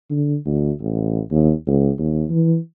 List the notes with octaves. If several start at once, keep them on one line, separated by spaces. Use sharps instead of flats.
D3
D2
A1
D#2
C#2
D#2
E3